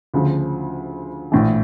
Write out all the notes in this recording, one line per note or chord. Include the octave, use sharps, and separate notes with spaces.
D2 C#3 F3
A#1 A2 E3